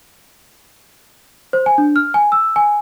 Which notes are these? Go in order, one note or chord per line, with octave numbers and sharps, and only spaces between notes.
C5
G#5
D4
F6
G#5
E6
G#5